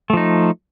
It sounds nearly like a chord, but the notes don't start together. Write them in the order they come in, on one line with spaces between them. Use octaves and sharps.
A3 F3 D#4